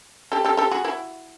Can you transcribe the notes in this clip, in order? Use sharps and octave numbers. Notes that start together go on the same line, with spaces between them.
G4 A4
G4 A4
G4 A4
F#4 G#4
E4 F#4